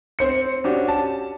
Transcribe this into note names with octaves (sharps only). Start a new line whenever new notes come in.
C4 C5 C#7
C#4 D4 F#4 G4 C#5
A5